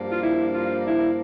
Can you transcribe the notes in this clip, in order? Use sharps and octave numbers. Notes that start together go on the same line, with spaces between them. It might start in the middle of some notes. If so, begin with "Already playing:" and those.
Already playing: G2 F3 A#3 D4
F4
E4
F4
E4